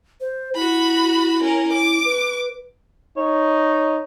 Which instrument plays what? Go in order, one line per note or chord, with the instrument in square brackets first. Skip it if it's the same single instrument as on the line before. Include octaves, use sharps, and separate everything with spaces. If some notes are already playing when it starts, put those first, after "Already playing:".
[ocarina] C5
[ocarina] E4 [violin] F#4 B5
[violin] C#4 A#4
D6
[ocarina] B4
[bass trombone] D#4 [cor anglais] C#5